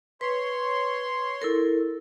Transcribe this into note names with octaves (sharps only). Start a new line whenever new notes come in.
B4 C#5 C6
E4 A4 A#4